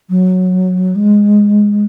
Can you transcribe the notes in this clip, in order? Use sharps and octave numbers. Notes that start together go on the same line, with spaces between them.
F#3
G#3